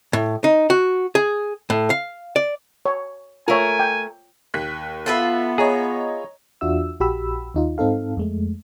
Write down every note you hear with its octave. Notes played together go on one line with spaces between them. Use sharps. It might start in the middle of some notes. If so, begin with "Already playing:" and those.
A2
D#4
F#4
G#4
A2
F5
D5
C#5
A3 F4 A#4 C#5 G#5
G5
D#2 F#6 B6
B3 F4 A4 B4 E5
G#4 C#5 D#5 A#5
E2 D4 F4 F#4 E5 E6
A#1 F#4 G4 B5 E6
D#2 D#4 F4
G#2 C4 D#4 A4 F5
F2 G#3 A3